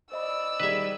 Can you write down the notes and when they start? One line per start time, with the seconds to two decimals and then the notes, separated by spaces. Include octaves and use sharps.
0.12 C5 D5 D#5 B5 E6
0.60 D#3 G3 G#4 B4 E5